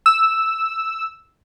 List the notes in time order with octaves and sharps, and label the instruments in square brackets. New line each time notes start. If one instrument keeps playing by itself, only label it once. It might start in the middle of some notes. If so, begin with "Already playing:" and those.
[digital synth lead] E6